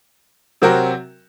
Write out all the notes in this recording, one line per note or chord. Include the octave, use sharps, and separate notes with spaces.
C3 F#3 C4 F#4 A#4